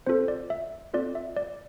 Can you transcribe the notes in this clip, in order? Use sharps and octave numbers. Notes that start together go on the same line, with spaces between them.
C4 F4 A4 C5
D5
E5
C4 F4 A4 D5
E5
D5